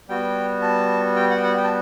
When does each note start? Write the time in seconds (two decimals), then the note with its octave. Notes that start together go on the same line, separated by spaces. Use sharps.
0.08 G3 B3 F#4 G5
0.62 A5
1.16 G5
1.30 F#5
1.38 G5
1.43 F#5
1.57 G5
1.64 A5